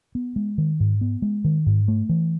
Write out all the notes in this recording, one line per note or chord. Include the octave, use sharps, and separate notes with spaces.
B3
G#3
D#3
G#2
B3
G#3
D#3
G#2
A3
E3